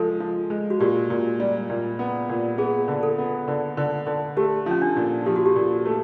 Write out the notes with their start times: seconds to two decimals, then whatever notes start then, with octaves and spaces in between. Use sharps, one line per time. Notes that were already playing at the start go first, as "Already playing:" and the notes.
Already playing: F3 G#3 A4
0.20 F3
0.50 G#3
0.70 F#4
0.80 A#2 G4
1.10 A#2
1.40 G3
1.70 A#2
1.99 B3
2.29 A#2
2.58 B3 G#4
2.88 D3
3.03 A4
3.18 B3
3.48 D3
3.77 D3
4.07 D3
4.37 A3 G4
4.66 F3 C#4
4.82 D4
4.96 A#2
5.26 F3 G4
5.36 F#4
5.46 G4
5.56 A#2
5.85 A3